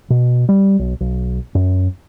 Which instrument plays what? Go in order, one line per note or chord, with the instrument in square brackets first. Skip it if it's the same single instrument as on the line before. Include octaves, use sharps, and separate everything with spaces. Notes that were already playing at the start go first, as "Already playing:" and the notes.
[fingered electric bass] B2
G3
B1
B1
F#2